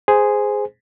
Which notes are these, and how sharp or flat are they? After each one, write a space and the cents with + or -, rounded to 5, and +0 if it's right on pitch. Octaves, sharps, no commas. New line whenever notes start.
G#4 +0 C5 -10